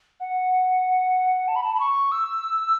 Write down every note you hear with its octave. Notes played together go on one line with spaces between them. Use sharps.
F#5
A5
B5
A5
B5
C#6
E6